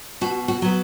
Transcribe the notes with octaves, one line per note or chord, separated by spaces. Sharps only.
B2 F#4
F#4
F#3 B3